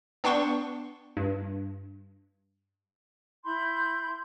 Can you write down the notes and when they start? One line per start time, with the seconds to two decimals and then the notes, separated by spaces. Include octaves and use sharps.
0.24 B3 D4 G5 C6 C#6
1.17 G2
3.44 E4 B5 C6 G6